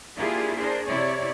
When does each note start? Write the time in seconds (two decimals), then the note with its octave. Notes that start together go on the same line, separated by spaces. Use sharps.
0.18 A#3 D4 E4 F4 G4 G#4
0.57 D4 G#4 A#4 C5
0.87 C3 C4 E4 C#5 D5